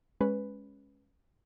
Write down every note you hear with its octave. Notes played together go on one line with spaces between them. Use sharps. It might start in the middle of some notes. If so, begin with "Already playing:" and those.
G#3 C#4 B4